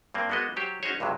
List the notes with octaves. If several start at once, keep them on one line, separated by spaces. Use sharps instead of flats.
G2 A#3 C4
G#3 A#3 B3 F#4 D#5
F#3 G4 C5 C#5
C#4 D#4 F#4 G#4 C5 C#5
C#2 G2 C3 F#3